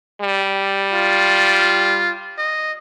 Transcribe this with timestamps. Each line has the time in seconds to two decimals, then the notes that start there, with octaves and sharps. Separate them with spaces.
0.21 G3
0.92 F4
2.38 D#5